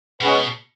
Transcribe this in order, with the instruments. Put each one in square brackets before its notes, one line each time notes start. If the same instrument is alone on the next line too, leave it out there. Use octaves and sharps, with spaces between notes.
[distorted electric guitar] B2 [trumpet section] G#3 C#4 G#4 B4 F#5